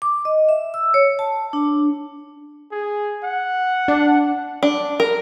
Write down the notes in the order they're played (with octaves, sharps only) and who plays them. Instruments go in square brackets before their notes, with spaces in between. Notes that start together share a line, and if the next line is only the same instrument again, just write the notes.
[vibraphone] D6
D#5
E5
E6
C#5
A5
D4
[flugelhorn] G#4
F#5
[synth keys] D4
[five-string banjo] D4
A#4